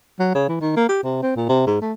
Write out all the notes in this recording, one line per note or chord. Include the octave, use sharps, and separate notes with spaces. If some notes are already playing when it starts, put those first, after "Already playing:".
F#3
C#3
E3
D#3
A#3
G4
C3
C4
A#2
C3
G#2
A3